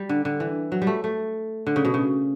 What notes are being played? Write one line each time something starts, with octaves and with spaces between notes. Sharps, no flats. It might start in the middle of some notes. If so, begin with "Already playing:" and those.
Already playing: G3
D3
D3
E3
F#3
G3
A3
A3
D3
C#3
B2
C#3